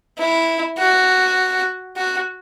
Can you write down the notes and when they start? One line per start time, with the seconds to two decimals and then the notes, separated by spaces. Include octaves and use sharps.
0.19 E4
0.79 F#4
1.97 F#4